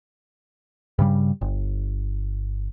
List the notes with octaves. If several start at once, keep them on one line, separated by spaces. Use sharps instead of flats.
G2 C#3 G3
G1